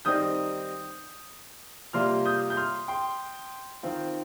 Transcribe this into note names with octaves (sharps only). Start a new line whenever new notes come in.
D#3 G3 C4 D#4 D#6 G6
C3 G3 A#3 F4 C6 F6
D#6 G6
G6
C6 F6
G5 C6
D#3 C4 F4